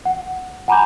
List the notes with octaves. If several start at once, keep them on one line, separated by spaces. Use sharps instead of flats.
F#5
F#5 G#5 A#5 B5 D6 G6